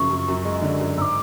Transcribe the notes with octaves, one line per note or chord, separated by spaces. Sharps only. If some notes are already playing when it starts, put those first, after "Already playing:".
Already playing: F#2 C#3 F3 C#6
F#2
F#2
G#3
D3
F#2
G#2 D6 E6